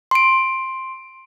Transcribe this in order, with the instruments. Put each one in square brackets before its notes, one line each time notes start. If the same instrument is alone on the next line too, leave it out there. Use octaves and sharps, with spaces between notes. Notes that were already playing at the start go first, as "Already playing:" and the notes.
[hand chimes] C6 D7